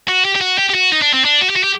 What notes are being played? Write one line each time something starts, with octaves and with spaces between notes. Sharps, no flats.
F#4
G4
G4
F#4
G4
G4
F#4
D#4
D4
C4
D4
F#4
G4
F#4
G4